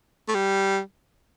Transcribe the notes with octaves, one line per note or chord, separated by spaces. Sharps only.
A3
G3